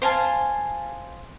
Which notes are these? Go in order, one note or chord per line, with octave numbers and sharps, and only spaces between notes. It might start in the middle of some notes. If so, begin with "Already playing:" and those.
C5 F5 G#5 A5